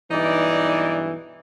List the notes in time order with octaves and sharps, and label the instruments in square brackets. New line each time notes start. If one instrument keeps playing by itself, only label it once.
[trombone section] B1 G2 E3 [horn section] D#4 D5